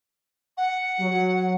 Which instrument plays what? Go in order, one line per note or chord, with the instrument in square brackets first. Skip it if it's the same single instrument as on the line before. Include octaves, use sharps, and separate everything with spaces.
[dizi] F#5
[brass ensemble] F#3